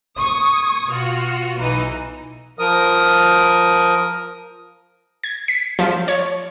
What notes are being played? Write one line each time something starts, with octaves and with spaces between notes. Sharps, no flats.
C#6 D#6 G#6
B2 F4 F#4
B1 E3 D#4
F3 A#4 D#6
G#6
B6
F3
C#5